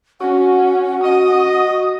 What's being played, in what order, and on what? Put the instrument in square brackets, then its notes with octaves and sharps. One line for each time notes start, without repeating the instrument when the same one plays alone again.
[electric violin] C#4 [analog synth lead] F#4 [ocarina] F#5
[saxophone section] D#5 [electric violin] D#6